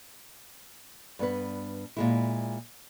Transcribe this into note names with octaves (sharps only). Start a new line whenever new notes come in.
G2 B3 B4
A#2 G#3 E4